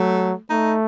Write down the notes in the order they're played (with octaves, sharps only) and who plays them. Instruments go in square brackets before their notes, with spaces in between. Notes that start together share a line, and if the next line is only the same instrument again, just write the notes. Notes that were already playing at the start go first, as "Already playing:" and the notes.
Already playing: [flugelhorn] F#3 [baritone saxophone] A3
[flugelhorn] A3 [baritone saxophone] D#4